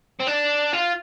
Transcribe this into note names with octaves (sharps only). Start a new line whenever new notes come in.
C4
D4
F4